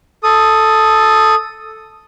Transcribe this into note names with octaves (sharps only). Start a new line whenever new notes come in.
A4 D#6